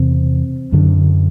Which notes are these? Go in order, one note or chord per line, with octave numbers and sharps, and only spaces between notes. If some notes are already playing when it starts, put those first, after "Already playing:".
Already playing: E2 C3 C4
F#2 D3